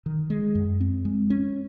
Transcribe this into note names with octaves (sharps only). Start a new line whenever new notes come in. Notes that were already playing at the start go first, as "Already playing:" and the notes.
D#3
G#3
F#2
C4
G#3
C#4